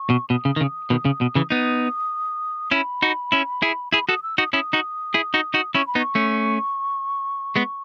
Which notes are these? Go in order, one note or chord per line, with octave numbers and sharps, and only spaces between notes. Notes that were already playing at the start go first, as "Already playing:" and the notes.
Already playing: C#6
B2
B2 D#6
C#3
D#3
C#3
B2 D#3
C#3
B2
C#3 E3
B3 D#4 D#6
C#4 E4 B5
D#4 F#4
C#4 E4
E4 G#4
E4 G#4 B5
F#4 A4 D#6
E6
D#4 F#4 D#6
C#4 E4 D#6
D#4 F#4
E4 G#4
D#4 F#4
D#4 F#4
C#4 E4 C#6
B5
B3 D#4
C#6
A3 C#4
G#3 B3